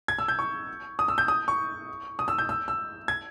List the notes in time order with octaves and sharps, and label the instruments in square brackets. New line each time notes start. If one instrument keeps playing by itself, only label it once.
[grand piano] G#6
E6
G6
C#6
D#6
E6
G6
D#6
C#6
D#6
E6
G6
E6
E6
G#6